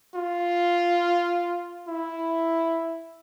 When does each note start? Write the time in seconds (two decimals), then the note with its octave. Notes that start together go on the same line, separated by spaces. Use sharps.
0.14 F4
1.88 E4